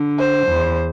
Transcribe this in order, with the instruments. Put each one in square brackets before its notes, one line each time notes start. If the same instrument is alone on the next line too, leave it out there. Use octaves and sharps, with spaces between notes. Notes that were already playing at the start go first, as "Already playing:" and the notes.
Already playing: [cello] D3
[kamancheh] C5
[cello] E2